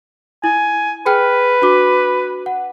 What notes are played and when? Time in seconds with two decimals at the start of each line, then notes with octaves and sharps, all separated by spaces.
0.44 E4 G#5
1.06 G#4 B4 G5 F6
1.62 D4 F#4 D6
2.46 F#5